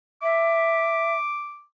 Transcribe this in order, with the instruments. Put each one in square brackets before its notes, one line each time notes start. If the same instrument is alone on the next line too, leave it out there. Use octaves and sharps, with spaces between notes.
[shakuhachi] E5 [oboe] D6